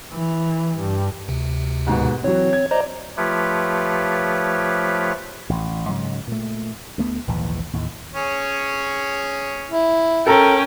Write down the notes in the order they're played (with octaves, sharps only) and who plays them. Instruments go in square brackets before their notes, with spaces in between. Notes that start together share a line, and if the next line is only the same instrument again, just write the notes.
[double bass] E3
G2
[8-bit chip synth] D2 C3
[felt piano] D#2 G#2 B2
[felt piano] E3 F#3 F#4 [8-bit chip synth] C4 C#5
[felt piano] G#6
[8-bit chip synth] C5 D#5 A#5 [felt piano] D5
[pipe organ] F3 A3 F4 G4 B4 C#5
[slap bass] A1
G#2 C#3 F#3
A#2 A3
D2 A3 B3
A#1 D#2 G#2 E3
D#2 A2
[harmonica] C#4 G#4 C#5
[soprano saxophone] E4
[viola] C#4 G5 [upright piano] A4 A#4